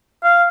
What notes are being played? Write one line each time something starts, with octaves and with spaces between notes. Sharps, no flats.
F5